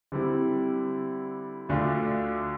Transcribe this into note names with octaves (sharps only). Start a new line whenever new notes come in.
D3 G3 C4 E4
D2 D3 A3 D4 F4